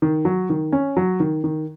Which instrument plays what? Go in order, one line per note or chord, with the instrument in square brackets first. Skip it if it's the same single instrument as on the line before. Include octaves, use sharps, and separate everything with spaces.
[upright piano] D#3
F#3
D#3
C#4
F#3
D#3
D#3